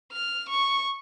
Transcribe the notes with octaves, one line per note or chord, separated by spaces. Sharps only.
F6
C#6